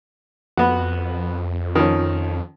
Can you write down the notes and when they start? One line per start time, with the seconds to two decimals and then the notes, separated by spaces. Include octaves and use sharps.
0.57 F2 B3 F#4
1.75 D#3 F3 C#4